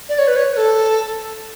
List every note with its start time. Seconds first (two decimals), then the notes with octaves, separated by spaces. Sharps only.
0.09 D5
0.19 C#5
0.28 B4
0.36 C#5
0.53 B4
0.57 A4